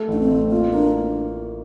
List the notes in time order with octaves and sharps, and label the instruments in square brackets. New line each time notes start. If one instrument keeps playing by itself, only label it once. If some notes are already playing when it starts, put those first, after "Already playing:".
Already playing: [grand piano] A3
[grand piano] A1 [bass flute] D4
[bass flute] C4
[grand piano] A1
[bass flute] A#3 [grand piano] F4
[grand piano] A#3 [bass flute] D4